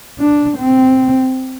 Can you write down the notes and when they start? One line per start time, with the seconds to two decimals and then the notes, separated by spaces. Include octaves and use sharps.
0.19 D4
0.58 C4